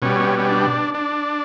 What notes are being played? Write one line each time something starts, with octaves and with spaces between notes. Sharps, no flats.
B2 G3 C#4
C#4
D4
D4